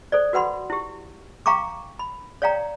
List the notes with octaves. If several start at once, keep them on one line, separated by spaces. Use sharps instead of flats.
A4 C5 D5
F#4 B4 F#5 B5 C6
E4 G4
F5 G5 A#5 C#6 D6
B5
C#5 D5 F5 G5 A#5